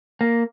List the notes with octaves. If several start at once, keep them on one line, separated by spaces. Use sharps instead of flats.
A#3